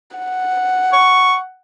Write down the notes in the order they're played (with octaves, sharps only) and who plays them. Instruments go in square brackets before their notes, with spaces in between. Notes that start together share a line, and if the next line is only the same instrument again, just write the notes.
[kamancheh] F#5
[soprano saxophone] C#6